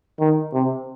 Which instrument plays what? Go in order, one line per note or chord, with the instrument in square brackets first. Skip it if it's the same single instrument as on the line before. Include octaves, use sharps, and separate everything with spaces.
[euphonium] D#3
C3